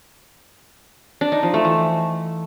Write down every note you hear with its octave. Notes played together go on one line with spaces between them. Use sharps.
D4
D#4
F3
A3
E3